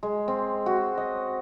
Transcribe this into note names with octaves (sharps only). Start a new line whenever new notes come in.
G#3
C4
F#4
D#5